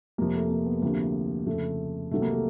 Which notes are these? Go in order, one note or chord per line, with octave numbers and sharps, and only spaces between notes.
F2 C3 F3 A#3
A3
A#3
B3
D2 C3 F3 A#3
F2 C#3 F3 A3
C2 C3 D#3 F#3 A3
A#3
A3